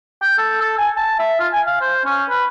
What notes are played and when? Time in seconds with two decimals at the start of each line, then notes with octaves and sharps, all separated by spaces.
0.22 G5
0.38 A4
0.61 A4
0.78 G#5
0.97 A5
1.19 E5
1.40 F4
1.53 G#5
1.66 F5
1.81 C5
2.05 C#4
2.30 B4